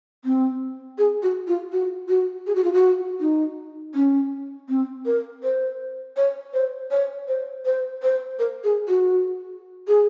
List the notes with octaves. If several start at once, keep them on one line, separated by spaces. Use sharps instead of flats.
C4
G#4
F#4
F4
F#4
F#4
G#4
F#4
F4
F#4
D#4
C#4
C4
A#4
C5
C#5
C5
C#5
C5
C5
C5
A#4
G#4
F#4
G#4